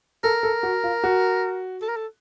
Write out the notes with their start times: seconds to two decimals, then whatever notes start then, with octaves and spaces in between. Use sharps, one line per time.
0.24 A4 A#4
0.43 A4
0.63 F#4
0.84 F4
1.04 F#4
1.82 A4
1.89 A#4
1.96 A4